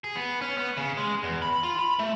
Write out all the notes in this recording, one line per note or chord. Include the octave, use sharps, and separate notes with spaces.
G#4
B3
C#4
B3
C#3
G#3
E2
B5
F4
B5
A3